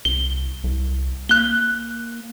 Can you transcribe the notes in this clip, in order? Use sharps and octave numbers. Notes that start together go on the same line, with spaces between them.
C2 G7
C2
A#3 F#6 G7